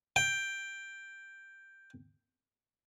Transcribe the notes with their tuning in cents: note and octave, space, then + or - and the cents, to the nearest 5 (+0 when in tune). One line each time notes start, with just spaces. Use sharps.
G5 +5